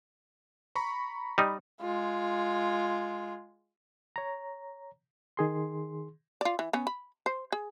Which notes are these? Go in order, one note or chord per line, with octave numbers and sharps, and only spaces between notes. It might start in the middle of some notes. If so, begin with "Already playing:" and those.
A#5 B5 C#6
G3 D#4
G#3 F4
C#5 A#5
D#3 G#4 C6
F4 D5
E3
B3 C#4
B5
C5
G#4